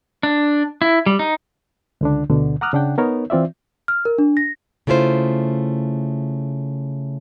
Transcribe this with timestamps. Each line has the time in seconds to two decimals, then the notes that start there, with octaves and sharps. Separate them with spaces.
0.23 D4
0.82 E4
1.06 G3
1.19 D#4
2.01 C#2 D3 D4
2.30 D2 B2 D3
2.61 F#5 A#5 D6 D#6 F6 F#6
2.73 C#3 D4 F#5 G5
2.98 B3 D#4 A#4 C#5
3.30 E3 C4 F4 D5 E5
3.88 F6
4.05 A#4
4.18 D4
4.37 A#6
4.87 C#3 A3 E4 F4 C5